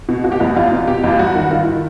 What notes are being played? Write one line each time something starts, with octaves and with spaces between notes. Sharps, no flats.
B2
B2 F#4
G4
E2 F#4
E2 F4
B2
B2 G4
E2 F4
G2 F#4
D#3
D#3 F4
E4